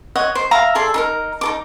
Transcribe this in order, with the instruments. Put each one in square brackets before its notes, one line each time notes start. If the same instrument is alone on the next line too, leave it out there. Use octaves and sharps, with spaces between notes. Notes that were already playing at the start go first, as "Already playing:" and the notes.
[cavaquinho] C#5 D#5 F#5
C5
E5 F5 A#5
G#4 A4 D5 C6
D#4 A4 A#4
D#4 A4 D6